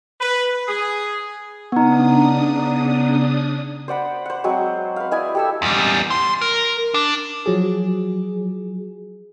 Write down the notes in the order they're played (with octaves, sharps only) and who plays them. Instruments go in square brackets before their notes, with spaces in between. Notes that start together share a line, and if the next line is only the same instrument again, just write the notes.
[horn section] B4
G#4
[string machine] C#3 D4 D#6 [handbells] B3 D#4
[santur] C5 D5 F#5 B5
C5 F#5
F#3 G#3 C4
B4 F5
E4 D5 D#5 G#5
G4 A4 E6
[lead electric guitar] E2 G3
C6
A#4
D4
[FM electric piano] F3 F#3 G#4